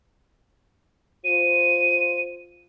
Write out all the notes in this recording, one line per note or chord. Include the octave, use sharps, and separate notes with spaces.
F4 C5 D#7